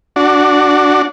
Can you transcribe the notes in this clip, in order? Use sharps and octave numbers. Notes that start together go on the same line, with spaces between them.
D4 F#4